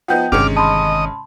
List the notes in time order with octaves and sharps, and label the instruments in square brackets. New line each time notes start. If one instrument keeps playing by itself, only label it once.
[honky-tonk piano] F3 B3 D#4 [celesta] F#5 G5 G6
[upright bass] G1 D#3 [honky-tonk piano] C3 G#3 C#4 [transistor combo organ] D6 F6
[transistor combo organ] D#5 [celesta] A5 B5 C6